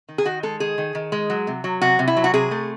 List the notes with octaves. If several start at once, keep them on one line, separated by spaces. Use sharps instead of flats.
D#3
G#4
D#3 F#4
G#3 A4
D#3 G#4
D#3
D#3
G#3
F#3
C3
F#3
C3 F#4
C3
E4
F#3
F#4
C3 G#4
A3